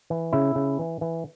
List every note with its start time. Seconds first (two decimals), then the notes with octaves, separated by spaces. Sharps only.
0.10 E3
0.33 C#3 E4
0.55 C#3
0.79 E3
1.01 E3